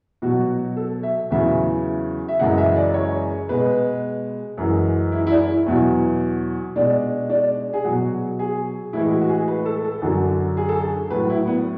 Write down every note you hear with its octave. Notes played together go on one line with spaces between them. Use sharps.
B2 F#3 F#4
A4
E5
E2 C#3 F#3 E5
E5
F#2 C#3 E3 G#3 F#5
E5
D5
C#5
B2 G#3 B4
F#2 E3 G#3
E4
E4
D4
E4
E2 B2 F#3
B2 G#3 D4
D4
G#4
B2 F#3 F#4
G#4
A2 E3 G#3 E4
F#4
F#4
G#4
B4
A4
A4
F#2 D3 F#3
G#4
A4
G#4
A2 F#3 B4
E4
B3